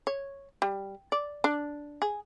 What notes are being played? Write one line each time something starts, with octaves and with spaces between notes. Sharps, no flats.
C#5
G3
D5
D4
G#4